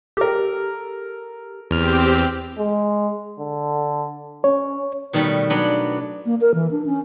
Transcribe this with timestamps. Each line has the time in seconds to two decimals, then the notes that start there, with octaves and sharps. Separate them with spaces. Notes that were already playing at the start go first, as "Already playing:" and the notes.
0.17 G4 A4 A#4
1.71 E2 C4 G4 F6
2.58 G#3
3.39 D3
4.44 C#4 C#5
5.13 B2 D#3 G3 A3
5.50 F#3 B3 D4
6.26 A#3
6.41 A#4
6.54 E3
6.71 D4
6.86 C#4